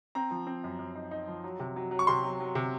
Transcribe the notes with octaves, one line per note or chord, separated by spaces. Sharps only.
C4 A#5
F3
C4
F#2
F#2
D#4
D#4
F3
F#3
C3
F#3
F#3
C#6
C3 C6
F#3
F#3
C3